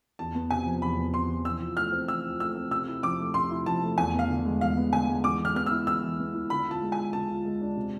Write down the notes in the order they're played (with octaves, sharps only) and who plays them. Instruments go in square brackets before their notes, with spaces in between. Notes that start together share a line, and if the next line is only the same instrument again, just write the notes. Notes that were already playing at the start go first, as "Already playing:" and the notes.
[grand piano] E2 [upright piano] A5
[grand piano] B3
[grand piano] C3 [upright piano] G#5
[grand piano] F3
[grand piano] E2 [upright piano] B5
[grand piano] B3
[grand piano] C3 [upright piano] C6
[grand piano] F3
[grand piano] E3 [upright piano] E6
[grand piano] F4
[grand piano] A3 [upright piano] F6
[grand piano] C4
[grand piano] E3 [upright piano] E6
[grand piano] F4
[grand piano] A3 [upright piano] E6
[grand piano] C4
[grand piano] C3 [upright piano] E6
[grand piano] E4
[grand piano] F3 [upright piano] D6
[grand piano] A3
[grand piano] C3 [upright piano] C6
[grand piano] E4
[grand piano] F3 [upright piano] A5
[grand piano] A3
[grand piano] E2 [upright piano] G#5
[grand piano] B3
[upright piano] F5
[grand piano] D3
G#3
[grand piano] E2 [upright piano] F5
[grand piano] B3
[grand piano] D3 [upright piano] G#5
[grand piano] G#3
[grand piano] E3 [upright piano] D6
[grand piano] E3
[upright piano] F6
[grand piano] B3 [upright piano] F6
[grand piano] E4 [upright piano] E6
[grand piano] E3 [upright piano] E6
[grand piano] E3
B3
E4
[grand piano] D3 [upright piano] B5
[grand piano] F4 [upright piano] A5
[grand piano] G#3
[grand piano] D4 [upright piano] G#5
[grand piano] D3 [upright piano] A5
[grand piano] F4
G#3
D4
C3